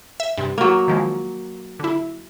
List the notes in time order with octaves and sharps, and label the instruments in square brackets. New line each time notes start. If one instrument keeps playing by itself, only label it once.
[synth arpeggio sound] E5
G2 C3
[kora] F#3 A#3
[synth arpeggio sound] D#3 F3 G#3
D3 E4